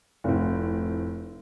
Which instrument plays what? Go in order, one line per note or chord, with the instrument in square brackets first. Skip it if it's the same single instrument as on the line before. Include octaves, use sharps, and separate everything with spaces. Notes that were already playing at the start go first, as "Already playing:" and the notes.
[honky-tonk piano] F1 A2 C4